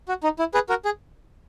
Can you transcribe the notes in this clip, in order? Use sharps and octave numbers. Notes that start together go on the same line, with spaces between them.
F#4
D#4
E4
G#4 B4
F#4 A#4
G#4